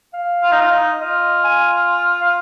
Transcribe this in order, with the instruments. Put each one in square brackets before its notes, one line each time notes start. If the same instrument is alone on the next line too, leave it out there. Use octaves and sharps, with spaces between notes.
[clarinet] F5
[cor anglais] F4
D#4
F4
D#4
[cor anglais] F4 [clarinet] D#5
[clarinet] G#5
F5